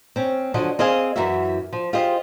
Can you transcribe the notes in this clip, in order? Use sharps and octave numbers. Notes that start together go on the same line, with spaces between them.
C4 C#4
D3 F3 F#3 D#5
C4 G#4 D#5 F5 G#5
F#2 E3 E4 F#4 E5
F3
F4 G4 G#4 C5 D#5